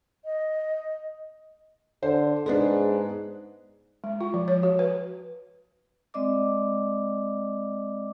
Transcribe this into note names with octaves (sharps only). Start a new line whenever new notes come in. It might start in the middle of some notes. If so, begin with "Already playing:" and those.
D#5
D3 C5
G#2 G#3 B3 D4
G#3
F4
F3
C#5
F#4
B4
G#3 C4 D5 D#5 D6